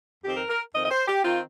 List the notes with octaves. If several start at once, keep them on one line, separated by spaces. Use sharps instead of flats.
F2 D#3 C4 G4
A#4
A#4
F2 D#3 C4 D#5
D#5
C5
G4
D#3 C4 F4